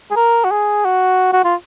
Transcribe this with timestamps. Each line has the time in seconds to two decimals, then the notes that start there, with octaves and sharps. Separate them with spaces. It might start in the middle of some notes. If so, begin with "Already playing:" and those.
0.11 G#4
0.16 A#4
0.45 F#4
0.51 G#4
0.85 F#4
1.33 F#4
1.44 F4